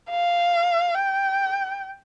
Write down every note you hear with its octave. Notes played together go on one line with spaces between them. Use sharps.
F5
G5